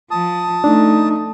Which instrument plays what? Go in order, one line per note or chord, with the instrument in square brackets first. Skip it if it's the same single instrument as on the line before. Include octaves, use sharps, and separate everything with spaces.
[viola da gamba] F3 [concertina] A5 D#6
[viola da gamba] A3 [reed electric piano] D4 [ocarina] D#4